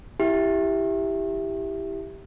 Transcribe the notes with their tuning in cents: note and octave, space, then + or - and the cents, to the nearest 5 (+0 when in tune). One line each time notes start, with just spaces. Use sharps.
E4 +0 G4 +0 E5 +0